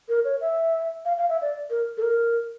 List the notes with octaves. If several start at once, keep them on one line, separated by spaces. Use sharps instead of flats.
A#4
C#5
E5
F5
F5
E5
D5
A#4
A4
A#4